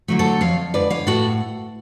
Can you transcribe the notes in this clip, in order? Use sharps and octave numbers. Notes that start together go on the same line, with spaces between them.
D3 F#3 A3
A4 C#5
F2 C#5 F5
D3 G#3 B4 D5
C#5 F5
A2 F#4 A4